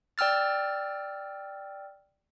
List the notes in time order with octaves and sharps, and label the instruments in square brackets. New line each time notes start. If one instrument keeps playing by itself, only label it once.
[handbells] D5 G5 E6 F6 A6